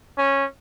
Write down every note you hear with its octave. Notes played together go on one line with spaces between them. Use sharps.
C#4